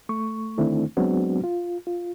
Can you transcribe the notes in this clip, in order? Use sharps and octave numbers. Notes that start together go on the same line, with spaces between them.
A3 C#6
D3 D#3 A3 C4 D4 E4
F#3 G#3 B3 C4 D4 F#4
F4
F4